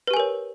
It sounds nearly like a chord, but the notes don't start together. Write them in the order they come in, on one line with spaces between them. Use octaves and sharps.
B4 G4 G#5 A#4 C#5